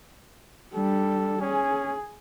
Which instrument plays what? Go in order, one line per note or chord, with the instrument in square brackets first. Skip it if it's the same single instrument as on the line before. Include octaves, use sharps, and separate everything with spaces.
[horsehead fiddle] G3 D4 [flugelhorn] A4
[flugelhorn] C#4 [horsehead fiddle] G#4